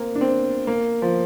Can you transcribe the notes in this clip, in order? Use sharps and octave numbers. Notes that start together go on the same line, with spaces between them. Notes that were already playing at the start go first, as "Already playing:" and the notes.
Already playing: A#3 C4
D4
C4
A#3
F3